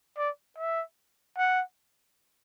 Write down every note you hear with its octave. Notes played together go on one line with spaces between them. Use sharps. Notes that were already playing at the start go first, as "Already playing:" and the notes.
D5
E5
F#5